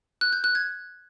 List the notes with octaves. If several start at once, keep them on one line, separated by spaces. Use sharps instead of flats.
F#6
G6
F#6
G#6